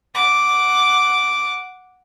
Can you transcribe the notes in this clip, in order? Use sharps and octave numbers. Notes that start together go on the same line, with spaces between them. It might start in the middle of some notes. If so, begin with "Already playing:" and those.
F#5 D6